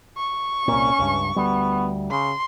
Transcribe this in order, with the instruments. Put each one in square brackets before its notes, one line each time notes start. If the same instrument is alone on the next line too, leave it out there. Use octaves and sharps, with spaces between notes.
[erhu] C#6
[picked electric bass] C2 A#2 [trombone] C#4
[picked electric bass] C#2 G2
[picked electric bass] D2 G3 [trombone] B3
[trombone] C#3 [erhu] C6